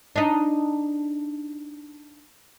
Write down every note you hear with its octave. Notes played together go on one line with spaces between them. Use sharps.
D4 D#4